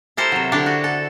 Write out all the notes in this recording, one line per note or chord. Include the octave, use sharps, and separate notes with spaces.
E4 G4 A4 A#4 C5
C3 F#3
D3 D4 E4 G4 D5
F#4
A4